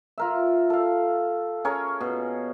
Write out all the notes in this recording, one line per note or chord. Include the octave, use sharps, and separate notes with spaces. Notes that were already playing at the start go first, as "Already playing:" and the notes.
F4 A#4 E5
A4 F5
C#4 G#4 A#4 C#5
B2